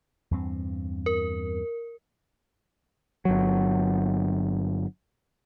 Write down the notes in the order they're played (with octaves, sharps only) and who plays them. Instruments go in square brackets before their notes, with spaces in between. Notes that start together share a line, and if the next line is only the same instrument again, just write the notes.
[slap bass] E2 G2 C4
[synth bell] A#4
[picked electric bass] G1 F#3